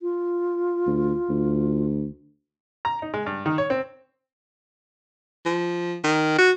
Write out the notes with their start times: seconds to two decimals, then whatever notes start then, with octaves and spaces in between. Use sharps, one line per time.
0.01 F4
0.87 D2
1.29 D2
2.85 A#5
3.02 D#4
3.14 G#3
3.26 G2
3.46 D#3
3.58 C#5
3.70 C4
5.45 F3
6.04 D#3
6.38 F#4